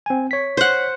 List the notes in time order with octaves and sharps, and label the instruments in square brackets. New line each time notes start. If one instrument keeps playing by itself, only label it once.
[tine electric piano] C4 G#5
C#5 B6
[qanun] C5 F#5